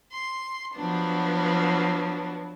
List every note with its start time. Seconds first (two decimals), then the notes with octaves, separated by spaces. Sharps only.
0.12 C6
0.75 F3 F#3 B3 D4